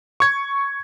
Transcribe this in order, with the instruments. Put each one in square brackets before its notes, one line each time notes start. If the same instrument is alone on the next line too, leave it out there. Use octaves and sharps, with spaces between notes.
[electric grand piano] C#6 G#6